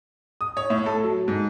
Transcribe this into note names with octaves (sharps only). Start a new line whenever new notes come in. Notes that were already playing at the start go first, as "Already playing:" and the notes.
D#6
C#5
A2
A4
F#3
G#2